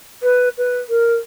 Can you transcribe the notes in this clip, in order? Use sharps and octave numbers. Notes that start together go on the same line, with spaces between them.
B4
B4
A#4